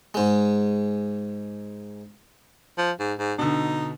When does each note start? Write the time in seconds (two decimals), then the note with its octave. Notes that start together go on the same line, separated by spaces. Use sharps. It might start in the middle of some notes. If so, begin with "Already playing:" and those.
0.14 G#2 G#3
2.78 F3
3.00 G#2
3.19 G#2
3.38 B2 D3 D#4